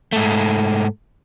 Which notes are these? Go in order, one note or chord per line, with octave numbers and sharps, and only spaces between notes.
G#2 A3